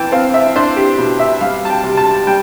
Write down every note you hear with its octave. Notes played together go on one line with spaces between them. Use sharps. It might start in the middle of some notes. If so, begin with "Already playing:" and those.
Already playing: E3 B3 G5 A5
C4 F5
E5
D4 C5
G4
B2
E5
G3 F5
A5
G5
C3
A5
G3 G5